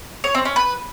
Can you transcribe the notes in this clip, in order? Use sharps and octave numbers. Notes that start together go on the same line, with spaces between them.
C#5
C4
C#4
B4